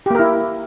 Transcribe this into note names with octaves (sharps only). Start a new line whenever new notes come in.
A#3 E4 G4 A#4